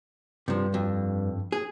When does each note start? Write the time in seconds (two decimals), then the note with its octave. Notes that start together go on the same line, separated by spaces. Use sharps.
0.48 G2 C3 F3
0.74 F2
1.52 G#4